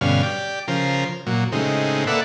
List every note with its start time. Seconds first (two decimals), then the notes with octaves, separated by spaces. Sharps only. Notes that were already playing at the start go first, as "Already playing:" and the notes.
0.01 G2 B2 D3 C#4 F5
0.23 G4 D5
0.68 C#3 F3 A#4 C5
1.27 A#2 F#3
1.52 A2 C#3 G#3 C4 D#4
2.07 A#3 A4 B4 D5 E5 F#5